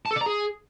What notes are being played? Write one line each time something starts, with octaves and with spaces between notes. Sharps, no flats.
A5
A4
D5
A#5
G#4